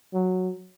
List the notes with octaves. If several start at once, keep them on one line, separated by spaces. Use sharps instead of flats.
F#3